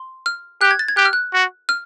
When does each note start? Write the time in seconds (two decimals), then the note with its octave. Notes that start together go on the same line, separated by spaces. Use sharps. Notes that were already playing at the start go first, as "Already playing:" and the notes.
Already playing: C6
0.26 F6
0.61 G4 F#6
0.71 G#6
0.79 A6
0.88 G#6
0.97 G4 F#6
1.05 F6
1.13 F#6
1.33 F#4
1.69 F6